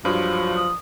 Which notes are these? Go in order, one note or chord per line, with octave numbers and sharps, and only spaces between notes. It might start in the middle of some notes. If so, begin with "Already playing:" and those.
G2 F3 F#3
D#6